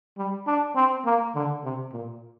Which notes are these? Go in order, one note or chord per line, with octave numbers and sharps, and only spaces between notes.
G3
D4
C4
A#3
D3
C3
A#2